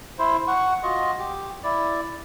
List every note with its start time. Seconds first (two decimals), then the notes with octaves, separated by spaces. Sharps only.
0.19 E4 C5
0.48 F#5 C#6
0.83 F4 F#4 D#5
1.19 G4
1.64 E4 D5